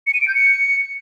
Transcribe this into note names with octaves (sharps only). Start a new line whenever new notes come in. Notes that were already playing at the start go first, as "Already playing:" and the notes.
C#7
D#7
D7
G6
C#7